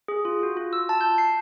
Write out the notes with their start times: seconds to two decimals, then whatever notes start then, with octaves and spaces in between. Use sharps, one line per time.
0.08 G#4
0.25 F4
0.43 F#4
0.57 F4
0.73 E6
0.89 A5
1.01 G6
1.18 C7